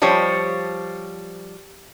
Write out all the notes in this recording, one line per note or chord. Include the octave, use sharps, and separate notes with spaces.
F3 G3 C5 C#5